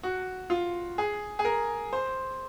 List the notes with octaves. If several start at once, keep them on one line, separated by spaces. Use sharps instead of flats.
F#4
F4
G#4
G#4
A#4
C5